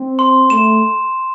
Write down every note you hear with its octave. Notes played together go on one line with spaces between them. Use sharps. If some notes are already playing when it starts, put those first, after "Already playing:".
Already playing: C4
C6
A3 E7